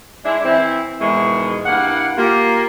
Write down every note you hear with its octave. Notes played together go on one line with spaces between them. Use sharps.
G#3 D4 E4
E3 C4 E4
E2 G#2 B2 D#3 G#3 E4
G2 E3 A#3 F#5
A#3 F4 G4